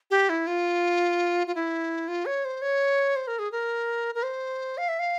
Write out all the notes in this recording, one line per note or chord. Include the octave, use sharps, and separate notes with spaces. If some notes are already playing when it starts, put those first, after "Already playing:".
G4
E4
F4
F4
E4
F4
C#5
C5
C#5
C5
A#4
G#4
A#4
A#4
C5
F5
E5
F5